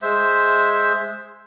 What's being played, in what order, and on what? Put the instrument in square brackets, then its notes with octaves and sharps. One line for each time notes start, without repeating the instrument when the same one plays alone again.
[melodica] G#3 C5 E5